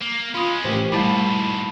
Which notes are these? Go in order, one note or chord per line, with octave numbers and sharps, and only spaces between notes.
A#3
G#3 C#4 F4 B5 D#6
A1 A3 G4 A#4 C5 B6
G#2 B2 G3 A3 E4 A5 B5